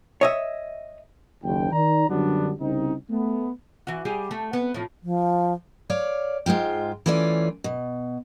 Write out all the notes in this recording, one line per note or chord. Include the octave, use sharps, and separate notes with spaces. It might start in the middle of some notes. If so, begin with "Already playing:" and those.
C#5 D#5 E5
F#1 D#2 G5
D#3 D5 A#5
F#2 D3 F#3 G3 B3 D4
C2 C#3 C4 D#4
A3 B3
E3 F#4
G3 G4 G#4
A3
B3
A2 F3
F3
C#5 D5 F5
G#2 G#3 F4 G5
E3 A3 C#4 F4 D5
B2